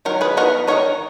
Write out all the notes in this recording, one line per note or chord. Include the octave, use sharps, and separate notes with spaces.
D#3 F#3 A#4
G#4 B4
E3 B3 D#4 F#4 A#4
D#3 A#3 D#4 A#4 C#5